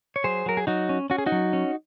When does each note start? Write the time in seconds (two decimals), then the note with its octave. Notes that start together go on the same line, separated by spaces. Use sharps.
0.16 C#5
0.24 F#3 G#4 C5
0.46 F#3 A#4
0.57 G#4
0.67 F#3 D#4 F#4
0.89 C#4
1.10 C#4 F#4
1.18 G#4
1.26 D#4 F#4
1.32 F#3
1.53 C#4